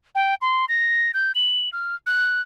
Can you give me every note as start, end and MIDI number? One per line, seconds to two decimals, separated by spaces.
0.15 0.35 79
0.42 0.65 84
0.69 1.12 94
1.14 1.32 91
1.35 1.69 102
1.73 1.95 89
2.06 2.41 90